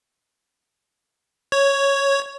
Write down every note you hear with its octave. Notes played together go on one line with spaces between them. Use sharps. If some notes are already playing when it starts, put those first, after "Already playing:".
C#5